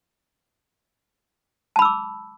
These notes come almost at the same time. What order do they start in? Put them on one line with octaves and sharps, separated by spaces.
A5 B5 E6 D6